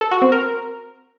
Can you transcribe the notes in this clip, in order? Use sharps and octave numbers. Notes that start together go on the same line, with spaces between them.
A4
F#4
C4
A#4